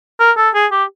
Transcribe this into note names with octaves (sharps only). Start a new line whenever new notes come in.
A#4
A4
G#4
G4